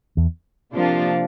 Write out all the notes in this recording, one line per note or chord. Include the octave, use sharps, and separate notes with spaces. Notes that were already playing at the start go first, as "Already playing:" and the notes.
E2
C3 F3 A#3 D4 F4